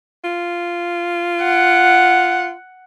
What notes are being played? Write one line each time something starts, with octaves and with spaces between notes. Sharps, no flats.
F4
F#5